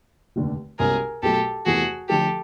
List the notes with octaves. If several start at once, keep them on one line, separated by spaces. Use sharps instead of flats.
F1 D#2 D3
C2 B2 G#3 C#4 G#4 A#4
B1 B2 F#3 A3 G4 A4
E2 C3 E3 A3 F#4 G#4
D3 F3 A3 G4 A4